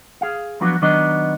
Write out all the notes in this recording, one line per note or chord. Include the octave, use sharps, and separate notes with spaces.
G#4 F5
F3 F#3 B3 D4 F#4
D#3 F#3 B3 D4 D#5